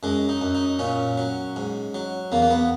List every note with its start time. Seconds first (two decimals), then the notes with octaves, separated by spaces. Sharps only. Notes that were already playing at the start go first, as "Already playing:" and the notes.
0.03 F#2 G#3
0.29 D#4
0.41 F#2
0.55 D#4
0.79 A#2 C#4
1.18 F#3
1.56 G#2
1.94 F#3
2.32 E2 A#3
2.42 A#3
2.51 B3